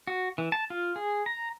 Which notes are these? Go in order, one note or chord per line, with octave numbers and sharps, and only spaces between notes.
F#4
E3
A5
F4
G#4
A#5